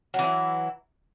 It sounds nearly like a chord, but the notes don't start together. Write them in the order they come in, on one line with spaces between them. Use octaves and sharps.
F#3 E3 E4